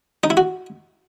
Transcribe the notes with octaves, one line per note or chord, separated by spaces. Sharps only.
D#4
E4
F#4